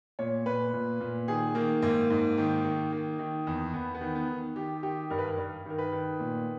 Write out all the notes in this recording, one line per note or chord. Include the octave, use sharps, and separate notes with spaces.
A#2 C#5
A#2 B4
A#2
A#2
D#3 G#4
D#3 A#3
G#2 A#3
G#2
D#3
D#3
D#3
D#3
E2
E2 B3
B3
D#3
B3
D#3
D#3 G4
D#3 G4
G2 A#4
B4
A#4
G2
D#3 A#4
B4
D#3
A#2